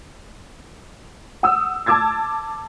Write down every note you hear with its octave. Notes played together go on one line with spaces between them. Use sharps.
F#5 D#6 E6
A5 D6 E6 G#6 A6